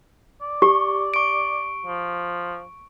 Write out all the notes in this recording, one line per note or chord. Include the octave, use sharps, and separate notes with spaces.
D5
G4 C#6
C#6 D7
F3